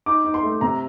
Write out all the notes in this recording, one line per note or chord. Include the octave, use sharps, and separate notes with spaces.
D#4 D6
D#4
C6
A3
C3 A#5